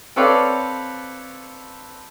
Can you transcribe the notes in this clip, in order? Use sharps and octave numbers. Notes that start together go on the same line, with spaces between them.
C4 A4 B4 C#5 D5 F5